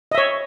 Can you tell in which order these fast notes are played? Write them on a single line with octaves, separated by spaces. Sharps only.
D#5 E5 C#5